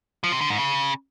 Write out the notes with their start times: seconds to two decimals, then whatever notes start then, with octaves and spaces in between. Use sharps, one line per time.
0.24 F3
0.32 C3
0.41 D3
0.50 G#2
0.58 C#3